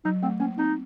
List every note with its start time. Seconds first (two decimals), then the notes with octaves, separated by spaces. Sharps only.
0.05 F#3 D#4
0.23 A3 C4
0.40 A#3 C#4
0.58 C4 D#4